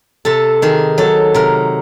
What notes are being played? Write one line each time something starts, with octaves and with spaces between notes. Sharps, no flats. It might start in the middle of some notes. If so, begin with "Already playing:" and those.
C3 A4
D#3 G#4
F#3 A4
C3 A#4